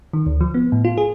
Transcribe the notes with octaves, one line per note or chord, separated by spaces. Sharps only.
D#3
D2
F3
B3
A2
F4
G#4